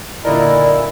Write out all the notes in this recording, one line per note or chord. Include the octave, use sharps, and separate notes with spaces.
A#2 D3 D#4 E4 A#4 D5 D#5